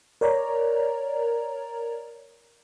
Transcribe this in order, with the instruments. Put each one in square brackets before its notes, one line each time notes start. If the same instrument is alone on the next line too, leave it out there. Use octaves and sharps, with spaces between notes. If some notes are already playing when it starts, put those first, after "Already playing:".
[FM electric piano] A#4 C#5 D5 A#5